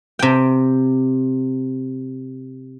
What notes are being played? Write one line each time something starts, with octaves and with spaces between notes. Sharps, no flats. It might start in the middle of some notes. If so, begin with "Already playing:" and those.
C3 G5